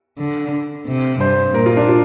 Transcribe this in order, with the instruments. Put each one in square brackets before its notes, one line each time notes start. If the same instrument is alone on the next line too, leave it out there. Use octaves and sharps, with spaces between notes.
[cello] D3
C3
[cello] G2 [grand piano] C5
[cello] A#2 [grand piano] A#4
[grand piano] F4
D4
F4